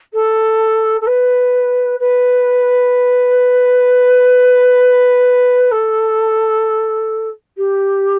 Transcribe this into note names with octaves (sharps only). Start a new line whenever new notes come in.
A4
A4
B4
B4
A4
G4